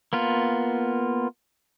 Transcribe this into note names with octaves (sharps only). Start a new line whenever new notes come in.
A#3 B3 F4